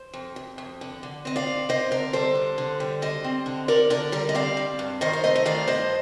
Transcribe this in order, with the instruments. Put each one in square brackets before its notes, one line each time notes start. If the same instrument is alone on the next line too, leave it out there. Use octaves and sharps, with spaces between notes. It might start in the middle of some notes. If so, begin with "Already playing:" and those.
Already playing: [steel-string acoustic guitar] C5
F2
F2
F2
D3
D3
C4 D#5
D5 F5
F2
C4 C5 D#5
D3 A#4 D5
G3 A4 C5
D3
D3
G3
G3 C5 D#5
C4
D3
D3 A#4 D5
D3 A#4 D5
G3 A#4 D5
D#5
C4 D5 F5
C4
G2
D#3 C5 D#5
F5
A3 C5 D#5
D#5
D#3 D5 F5
G2 C5 D#5